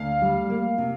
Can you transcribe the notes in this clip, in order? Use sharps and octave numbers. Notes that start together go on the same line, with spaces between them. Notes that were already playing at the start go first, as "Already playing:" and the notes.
Already playing: D2 F5
G3
A#3
C3